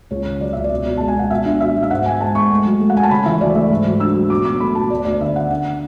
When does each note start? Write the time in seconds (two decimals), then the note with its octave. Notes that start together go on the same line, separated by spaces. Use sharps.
0.11 C#2 C#5
0.26 C#3
0.41 F#3 D5
0.53 C#2 E5
0.64 D5
0.71 B2
0.86 B2
0.97 G#3 A5
1.08 G#5
1.16 B2 F#5
1.30 B2 E5
1.45 D4
1.60 B2 E5
1.76 B2
1.83 E5
1.91 G#2 F#5
2.06 G#2 G#5
2.20 G#3 A5
2.35 G#3 C#6
2.51 A3
2.66 F#3
2.80 A3
2.90 F#5
2.96 A3 G#5
3.03 A5
3.10 C#3 B5
3.25 E3 E5
3.40 D2 D5
3.55 A3 E5
3.70 G#2
3.86 F#3
4.00 D4 E6
4.15 F#3
4.30 B2 D6
4.45 B2 D6
4.60 A3 B5
4.75 B2 A5
4.90 D2 D5
5.05 D2 D5
5.21 D3 E5
5.35 D3 F#5
5.50 D3 F#5